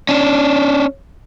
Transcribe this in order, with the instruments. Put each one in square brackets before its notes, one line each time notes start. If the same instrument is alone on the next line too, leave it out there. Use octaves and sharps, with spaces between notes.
[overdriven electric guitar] C#4 D4